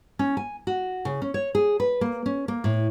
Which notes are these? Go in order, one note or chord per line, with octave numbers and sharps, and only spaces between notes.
C#4
G#5
F#4
C#3
C#4
C#5
G#4
B4
A#3
C#4
A#3
A2